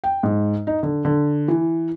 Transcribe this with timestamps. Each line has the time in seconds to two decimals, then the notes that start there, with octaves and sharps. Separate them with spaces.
0.04 G5
0.23 G#2
0.67 D#4
0.83 D3
1.05 D3
1.48 E3